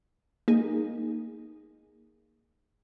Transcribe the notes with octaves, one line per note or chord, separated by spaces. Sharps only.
A#3 D#4 G#4